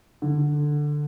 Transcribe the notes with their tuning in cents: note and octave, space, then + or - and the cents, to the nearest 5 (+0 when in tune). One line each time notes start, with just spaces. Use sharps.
D3 +5